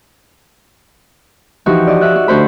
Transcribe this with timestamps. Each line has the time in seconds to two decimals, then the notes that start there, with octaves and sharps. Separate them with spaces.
1.66 E3 F3 D#4 F#4 G4
1.87 D5 D#5
2.01 E5 F#6
2.16 F#4
2.28 D2 F#4 C5 B5